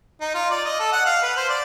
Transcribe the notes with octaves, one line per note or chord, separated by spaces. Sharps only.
D#4
F4
D5
D#5
A4
F#5
F5
B4
C5
D5